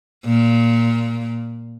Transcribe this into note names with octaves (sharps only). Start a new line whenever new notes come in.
A#2